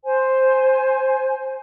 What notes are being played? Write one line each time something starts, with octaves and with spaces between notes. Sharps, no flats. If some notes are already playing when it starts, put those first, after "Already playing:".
C5 G#5